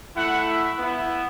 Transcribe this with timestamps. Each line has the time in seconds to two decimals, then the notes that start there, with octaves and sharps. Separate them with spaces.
0.16 A3 E4 F#5
0.47 E5
0.78 B3 E4